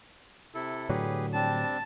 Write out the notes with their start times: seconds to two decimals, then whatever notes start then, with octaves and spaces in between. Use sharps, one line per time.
0.54 C3 E4 A4
0.89 A2 D3 F#3 G4 G#4 B4
1.34 G3 C4 D4 A5